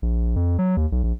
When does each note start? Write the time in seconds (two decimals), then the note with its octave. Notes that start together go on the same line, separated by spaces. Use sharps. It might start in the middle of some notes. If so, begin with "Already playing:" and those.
0.02 A#1
0.36 F2
0.58 F#3
0.77 D#2
0.92 B1
1.03 A#1